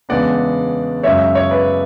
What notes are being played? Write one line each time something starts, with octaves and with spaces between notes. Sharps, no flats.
E2 C#3 G#3 B3 D4 D5 F#5
F#2 C#3 G#3 C#5 E5
C#5
B4 D5